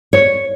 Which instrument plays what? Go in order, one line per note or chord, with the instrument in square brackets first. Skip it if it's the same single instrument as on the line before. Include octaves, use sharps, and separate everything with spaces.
[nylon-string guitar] C#5